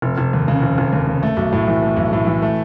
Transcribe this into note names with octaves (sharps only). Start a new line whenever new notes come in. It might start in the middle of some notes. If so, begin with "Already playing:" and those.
F1
F1
D#2
C#3
F1
F1
D#2
C#3
A3
B1
A2
E3
A3
B1
A2
E3
A3